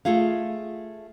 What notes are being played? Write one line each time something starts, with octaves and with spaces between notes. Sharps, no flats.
A3 F4 G#4 F5